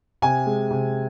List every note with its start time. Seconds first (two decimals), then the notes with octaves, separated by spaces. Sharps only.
0.22 C3 G#5
0.46 G#3
0.71 C3